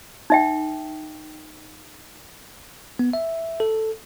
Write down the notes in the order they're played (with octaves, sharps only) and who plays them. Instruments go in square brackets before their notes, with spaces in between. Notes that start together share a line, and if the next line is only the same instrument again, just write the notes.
[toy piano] D#4 E5 G5
[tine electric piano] B3
E5
A4